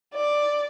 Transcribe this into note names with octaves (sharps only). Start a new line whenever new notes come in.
D5